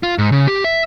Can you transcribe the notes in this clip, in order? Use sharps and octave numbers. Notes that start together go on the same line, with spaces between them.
F4
G#2
C#3
G4
E5